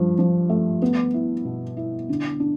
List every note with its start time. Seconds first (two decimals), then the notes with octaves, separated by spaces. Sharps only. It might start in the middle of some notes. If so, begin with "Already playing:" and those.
Already playing: G2 F3
0.19 F3
0.49 A3
0.82 B3
1.14 E4
1.45 B2
1.77 E4
2.09 D3
2.40 D4